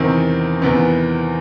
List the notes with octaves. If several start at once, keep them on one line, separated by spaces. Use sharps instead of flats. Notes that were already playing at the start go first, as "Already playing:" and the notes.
Already playing: E2 C3 D#3 C4
E2 C3 D#3 B3